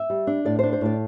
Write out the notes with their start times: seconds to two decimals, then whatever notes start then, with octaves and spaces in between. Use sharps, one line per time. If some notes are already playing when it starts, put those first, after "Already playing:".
Already playing: E5
0.10 G3
0.27 D4
0.45 A2 D5
0.59 C5
0.63 D4
0.73 C5
0.81 A2 D5